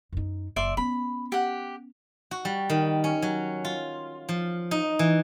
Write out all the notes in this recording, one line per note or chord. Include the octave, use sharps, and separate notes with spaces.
F#2 D#4
F#1 D5 E5 C6
B3 C#4 B5
G4 F#5
F#4
G3
D#3
C#4
F#3
F4
F3
D#4
E3